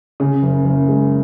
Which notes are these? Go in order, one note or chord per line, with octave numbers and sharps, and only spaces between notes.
C#3
F#1
F#1
G#3